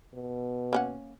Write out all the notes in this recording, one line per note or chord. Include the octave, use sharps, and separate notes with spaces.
B2
A#3 C#4 F#5